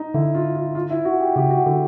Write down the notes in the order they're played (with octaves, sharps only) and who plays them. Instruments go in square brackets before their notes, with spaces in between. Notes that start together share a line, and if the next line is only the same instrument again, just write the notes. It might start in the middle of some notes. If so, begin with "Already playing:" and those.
Already playing: [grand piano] D#4
[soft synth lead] D3 [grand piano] E4
[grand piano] F4
F4
F4
E4
F#4
G4
[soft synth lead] C#3 [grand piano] G4
[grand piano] F#4
[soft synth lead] D3 [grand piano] F#4